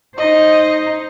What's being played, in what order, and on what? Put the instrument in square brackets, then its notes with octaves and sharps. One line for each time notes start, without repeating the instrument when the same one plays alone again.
[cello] D#4 C5 [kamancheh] D#5